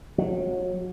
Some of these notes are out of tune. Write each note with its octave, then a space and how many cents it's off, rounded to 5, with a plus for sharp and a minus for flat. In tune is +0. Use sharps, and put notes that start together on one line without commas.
F#3 -30